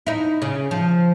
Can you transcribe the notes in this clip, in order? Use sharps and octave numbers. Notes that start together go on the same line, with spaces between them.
D#4 E4
C#3
F3